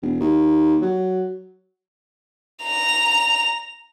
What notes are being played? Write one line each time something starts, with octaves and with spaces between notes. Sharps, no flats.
E1
D#2
F#3
A#5 F7